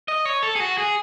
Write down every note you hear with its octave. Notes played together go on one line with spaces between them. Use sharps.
D#5
C#5
A4
G#4
F#4
G#4